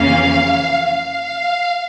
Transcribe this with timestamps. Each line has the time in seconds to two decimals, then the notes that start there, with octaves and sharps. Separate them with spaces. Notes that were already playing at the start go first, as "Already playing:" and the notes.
Already playing: F2 C#3 E3 A#3 C#4 F5
0.86 F5